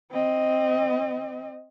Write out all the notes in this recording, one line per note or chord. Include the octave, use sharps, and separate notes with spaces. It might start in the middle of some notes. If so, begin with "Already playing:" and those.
C4 D#5